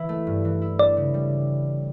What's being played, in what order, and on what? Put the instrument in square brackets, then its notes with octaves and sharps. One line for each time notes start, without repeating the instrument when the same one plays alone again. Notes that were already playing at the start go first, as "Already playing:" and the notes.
Already playing: [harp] E3 E4
A3
G2
E3
E4
[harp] D4 [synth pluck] D5
[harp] C#3
G3